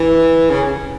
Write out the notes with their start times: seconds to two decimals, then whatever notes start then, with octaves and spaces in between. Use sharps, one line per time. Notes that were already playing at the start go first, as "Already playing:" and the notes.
Already playing: E3
0.50 C#3